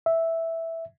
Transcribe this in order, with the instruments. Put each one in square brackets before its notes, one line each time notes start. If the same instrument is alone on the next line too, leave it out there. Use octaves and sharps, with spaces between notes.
[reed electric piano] E5